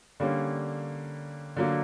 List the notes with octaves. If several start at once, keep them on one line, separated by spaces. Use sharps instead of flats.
D3 G3 A#3 C#4
D3 F#3 A#3